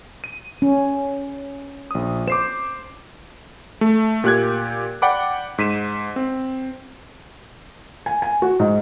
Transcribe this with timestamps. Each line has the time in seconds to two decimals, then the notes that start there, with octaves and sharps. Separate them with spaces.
0.24 D#7
0.62 C#4
1.91 A#1 D#6
2.28 C5 D6 C7 E7
3.81 A3
4.24 A#2 G4 F#6 G#6
5.02 D5 F#5 G5 B5 D6
5.58 G#2 B6 D#7 E7
6.16 C4
8.06 G#5
8.22 G#5
8.42 F#4
8.59 G#2